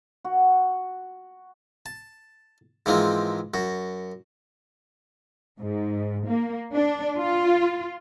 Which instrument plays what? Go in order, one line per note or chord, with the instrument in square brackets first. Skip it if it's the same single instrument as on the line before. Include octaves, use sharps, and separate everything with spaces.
[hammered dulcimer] F#4
[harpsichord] A5
G#2 E3 F3 G#3 A#3 C4
F#2 F#4
[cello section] G#2
A#3
D4
F4